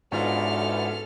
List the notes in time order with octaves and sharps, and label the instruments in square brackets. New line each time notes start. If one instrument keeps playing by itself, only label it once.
[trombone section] B1 E2 B2 [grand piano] G#2 D4 F4 [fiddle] A4 F6